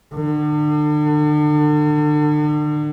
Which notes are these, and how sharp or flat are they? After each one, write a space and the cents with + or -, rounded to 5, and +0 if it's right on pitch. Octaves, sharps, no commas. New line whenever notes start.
D3 +35